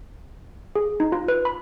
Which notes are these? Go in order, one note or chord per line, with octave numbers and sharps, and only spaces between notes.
G#4
D#4
F4
B4
B5